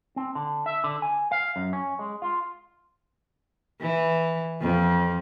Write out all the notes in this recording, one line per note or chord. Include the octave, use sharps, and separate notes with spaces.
C4
D3
E5
D3
G#5
F5
F#2
C#4
G#3
F4
E3
F2